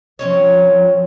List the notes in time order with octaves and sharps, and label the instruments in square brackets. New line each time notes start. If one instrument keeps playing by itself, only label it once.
[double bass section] F3 [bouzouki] C4 C#4 C#5